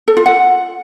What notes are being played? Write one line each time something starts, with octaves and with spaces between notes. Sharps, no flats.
A4
F4
F#5